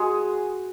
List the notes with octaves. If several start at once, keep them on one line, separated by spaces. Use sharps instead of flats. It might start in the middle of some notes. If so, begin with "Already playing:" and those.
Already playing: G#3 F#4 G#4